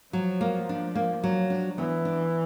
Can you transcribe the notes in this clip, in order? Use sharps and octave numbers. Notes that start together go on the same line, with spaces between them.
F3 F#3
A#3
D4
A#3
F#3
D4
E3 B3
D4